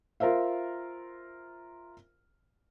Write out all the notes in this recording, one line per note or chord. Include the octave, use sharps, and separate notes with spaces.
F4 A#4 C5 E5 F5